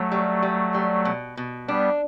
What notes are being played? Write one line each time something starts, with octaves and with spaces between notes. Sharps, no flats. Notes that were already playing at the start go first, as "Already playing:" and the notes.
Already playing: F#3 A3 C#5
G3
G3
G3
B2
B2
G3 B3 D4